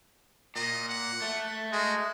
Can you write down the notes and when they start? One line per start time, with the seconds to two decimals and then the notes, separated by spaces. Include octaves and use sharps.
0.56 A#2 D#5
0.89 F#5
1.22 A3
1.72 G#3 F#4